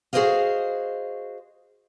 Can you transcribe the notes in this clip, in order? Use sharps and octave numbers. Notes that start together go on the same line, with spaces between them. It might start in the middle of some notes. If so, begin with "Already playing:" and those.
F#4 G#4 B4 C5 D#5 F5